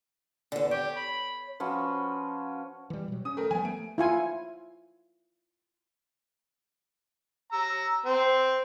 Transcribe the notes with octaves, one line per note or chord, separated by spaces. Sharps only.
E2 D3
G4 C#5
B5
F3 C#4 F#4 B4
E3 G3
B2 F#3
C#4 D#6
A3 A#4
F3 G3 B3 G#5
A3 D7
E4 F4 G#5
A#5 E6
C4 C6